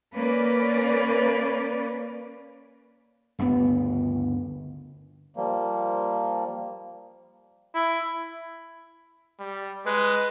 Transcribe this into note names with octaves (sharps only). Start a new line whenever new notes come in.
A#3 C#4 B4 D5
G1 D2 C#3 B3
F3 G3 A#3
E4
G3
G#3 B4